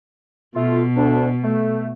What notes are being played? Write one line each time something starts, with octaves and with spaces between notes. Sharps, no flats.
B2 A3 F4
D2 D4
A3